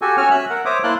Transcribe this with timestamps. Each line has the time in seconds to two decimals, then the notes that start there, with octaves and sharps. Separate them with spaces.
0.02 F#4 G4 A4 G#5
0.17 C#4 F#4 C#5 G#5 F6
0.31 E5 E6 F#6
0.50 A#4 F#5
0.65 C5 C#5 E5 D6 D#6
0.84 A#3 E4 F5 A5 C6 F#6